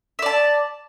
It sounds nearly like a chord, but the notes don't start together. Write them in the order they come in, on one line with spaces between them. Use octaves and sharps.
E5 D5 A5